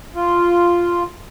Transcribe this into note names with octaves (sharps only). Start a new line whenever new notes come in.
F4